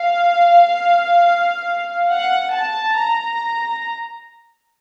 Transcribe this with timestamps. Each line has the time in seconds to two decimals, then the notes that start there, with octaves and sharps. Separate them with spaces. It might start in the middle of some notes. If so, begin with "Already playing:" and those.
Already playing: F5
2.11 F#5
2.53 A5
2.97 A#5